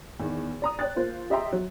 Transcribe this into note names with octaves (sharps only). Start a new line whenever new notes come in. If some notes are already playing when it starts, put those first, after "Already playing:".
E2 D#3
D5 A#5 D#6
C#5 D5 G5 F#6 A6
A#3 F4 C5
G4 D#5 E5 G5 A#5 C6
F#3